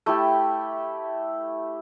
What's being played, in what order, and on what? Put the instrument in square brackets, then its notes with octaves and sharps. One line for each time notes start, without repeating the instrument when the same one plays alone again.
[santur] A3 E4 G4